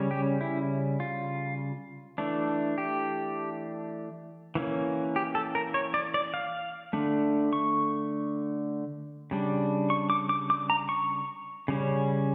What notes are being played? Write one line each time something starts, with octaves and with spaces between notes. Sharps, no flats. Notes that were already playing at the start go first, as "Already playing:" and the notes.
Already playing: C#3 G3 C#4
G4
E4
F4
E3 A3 D4
G4
E3 A#3 C#4
G4
A4
A#4
C#5
D5
D5
F5
D3 A3 D4
C#6
C#3 G3 D4
C#6
D6
D6
D6
A#5
C#6
C#3 G3 C#4